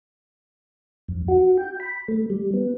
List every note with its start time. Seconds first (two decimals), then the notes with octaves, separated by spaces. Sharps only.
1.08 F2
1.28 F#4
1.58 G5
1.80 B5
2.08 A3
2.30 G3
2.54 B3